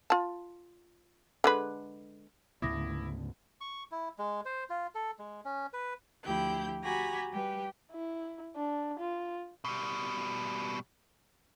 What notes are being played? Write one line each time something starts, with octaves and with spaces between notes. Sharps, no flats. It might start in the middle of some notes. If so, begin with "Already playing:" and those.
F4 A5
D3 G#3 B4
D2 G#2 C#3 B3 E4 D6 D#6 A#6
C#6
E4
G#3
C5
F4
A4
G#3
C#4
B4
D2 F3 E4 G4 G6
F#4 G4 G#5 A#5 B5
G3 G4 B4
E4
D4
F4
B2 G3